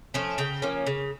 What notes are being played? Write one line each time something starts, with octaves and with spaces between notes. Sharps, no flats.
F3 A3 C#4
C#3 G5
F3 A#3 C#4
C#3